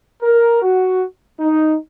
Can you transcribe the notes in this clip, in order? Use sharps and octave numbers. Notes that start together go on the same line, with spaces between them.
A#4
F#4
D#4